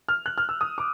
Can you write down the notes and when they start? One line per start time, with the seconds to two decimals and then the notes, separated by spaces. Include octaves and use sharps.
0.09 F6
0.26 F#6
0.38 F6
0.49 E6
0.61 D#6
0.78 D6